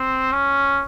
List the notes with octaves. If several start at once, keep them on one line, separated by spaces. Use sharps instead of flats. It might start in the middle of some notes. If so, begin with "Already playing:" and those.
Already playing: C4
C#4